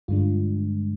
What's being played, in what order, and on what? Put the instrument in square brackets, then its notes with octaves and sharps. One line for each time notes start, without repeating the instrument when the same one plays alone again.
[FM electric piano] G2 D3 G#3 D4 F4